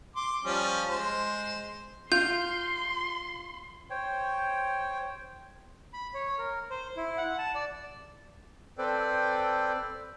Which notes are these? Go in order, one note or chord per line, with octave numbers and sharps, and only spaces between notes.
C6 D6
F3 G3 C#4
G#3 C5
F4 C6 G6
C5 C#5 G5
B5
C#5
A#4
C5
E4
F#5
A5
D5
C4 A4 B4 C5 D5 G5